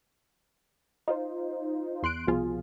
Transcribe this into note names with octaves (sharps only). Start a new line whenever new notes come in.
D#4 F4 C5
E2 C6 F#6 D7
C2 B2 F3 F4 G#4